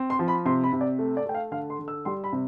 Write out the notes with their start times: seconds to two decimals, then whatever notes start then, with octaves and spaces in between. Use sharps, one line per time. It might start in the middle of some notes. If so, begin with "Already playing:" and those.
Already playing: C4
0.10 C6
0.19 F3
0.28 B5
0.45 C3 C6
0.64 B5
0.73 C3
0.81 D5
0.99 A3
1.17 D5
1.26 A3 G5
1.34 F5
1.52 D3 F5
1.70 C6
1.79 D3
1.88 E6
2.05 G3 C6
2.24 B5
2.33 C3